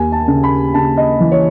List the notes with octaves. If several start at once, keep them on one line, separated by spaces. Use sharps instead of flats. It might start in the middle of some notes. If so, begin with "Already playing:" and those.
Already playing: D#2 G#5
A5
C#3
B5
C#3 A5
D#5
E3
C#5